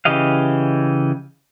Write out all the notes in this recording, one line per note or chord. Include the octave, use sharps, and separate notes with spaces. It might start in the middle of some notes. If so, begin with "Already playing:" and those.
C#3 E3 G4 D#5 F5